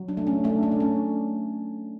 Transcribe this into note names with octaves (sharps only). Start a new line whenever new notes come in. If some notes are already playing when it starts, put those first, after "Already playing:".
Already playing: F#3
D4
A3
C#4
A3 D4
D4
A3
C#4